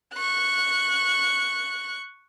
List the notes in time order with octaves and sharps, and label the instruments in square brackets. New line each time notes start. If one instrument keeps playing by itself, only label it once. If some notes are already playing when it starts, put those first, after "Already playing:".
[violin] C#6 F#6